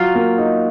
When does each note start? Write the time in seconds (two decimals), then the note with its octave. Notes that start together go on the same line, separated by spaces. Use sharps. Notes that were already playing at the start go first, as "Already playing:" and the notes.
Already playing: F#3 F4
0.15 A#3
0.38 D#4